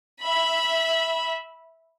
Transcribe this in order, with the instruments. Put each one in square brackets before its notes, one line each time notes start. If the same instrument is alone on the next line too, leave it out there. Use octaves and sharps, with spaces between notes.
[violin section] E5 B5